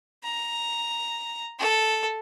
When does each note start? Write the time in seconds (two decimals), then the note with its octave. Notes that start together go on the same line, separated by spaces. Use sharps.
0.24 A#5
1.59 A4